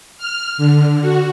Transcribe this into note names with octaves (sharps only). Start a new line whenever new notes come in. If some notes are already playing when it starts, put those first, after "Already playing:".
F6
D3
F#4